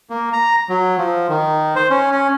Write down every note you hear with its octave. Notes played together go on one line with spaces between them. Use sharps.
A#3
A#5
F#3
F3
D#3
C5
C#4
C#4